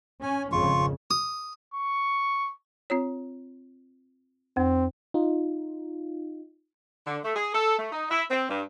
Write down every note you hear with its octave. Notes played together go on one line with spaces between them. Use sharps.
C#4 G#5
G#1 F2 C#3 F4 C#6
D#6
C#6
C4 F4 C#5
F2 C4
D#4 F4
D3
A3
G#4
A4
A3
D#4
E4
C4
G2